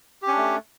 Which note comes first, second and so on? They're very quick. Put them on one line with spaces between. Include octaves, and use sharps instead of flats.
G4 C#4 D4 A3